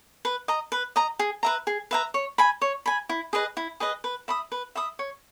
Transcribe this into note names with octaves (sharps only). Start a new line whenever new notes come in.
B4
D#5 A#5
B4
D#5 A#5
G#4
B4 E5 A#5
G#4
B4 E5 A#5
C#5
G#5 B5
C#5
G#5 B5
E4
G#4 B4 D#5
E4
G#4 B4 D#5
B4
E5 B5 D#6
B4
E5 B5 D#6
C#5